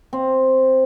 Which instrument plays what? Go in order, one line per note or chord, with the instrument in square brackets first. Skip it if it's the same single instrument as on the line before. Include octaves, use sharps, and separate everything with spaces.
[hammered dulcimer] C4